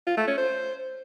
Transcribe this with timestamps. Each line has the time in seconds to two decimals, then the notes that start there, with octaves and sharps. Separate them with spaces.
0.07 F4
0.17 A3
0.27 C#4
0.38 C5